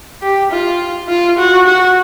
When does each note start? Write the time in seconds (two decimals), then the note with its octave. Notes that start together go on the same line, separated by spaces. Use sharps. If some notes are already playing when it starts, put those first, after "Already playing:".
0.22 G4
0.51 F4
1.08 F4
1.38 F#4
1.67 F#4